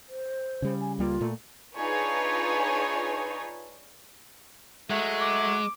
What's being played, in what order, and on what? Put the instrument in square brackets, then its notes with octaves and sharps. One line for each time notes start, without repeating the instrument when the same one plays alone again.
[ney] C5
[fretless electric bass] C#3 G3
[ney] G#5
[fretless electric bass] C#2 G3 A#3 [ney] F4
[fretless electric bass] A#2 A3
[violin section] D4 D#4 F4 G#4 B4 C#5
[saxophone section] F#3 A3 [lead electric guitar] G#3
[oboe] D6